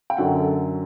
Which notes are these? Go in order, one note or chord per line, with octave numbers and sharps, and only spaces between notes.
G5
F#2 D3 F#3 F#5
A4